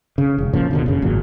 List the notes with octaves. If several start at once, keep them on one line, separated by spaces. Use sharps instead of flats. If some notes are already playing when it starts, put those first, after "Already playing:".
C#3
E1
A#2 C#3 F3
D#2 B2 D3
F#1 C#3
G#1 A#2 F#3